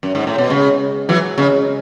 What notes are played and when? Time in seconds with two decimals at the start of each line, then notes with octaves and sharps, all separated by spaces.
0.03 F#2
0.15 G#2
0.27 A2
0.38 B2
0.50 C#3 G#3
1.09 E3 F#3
1.38 C#3 G#3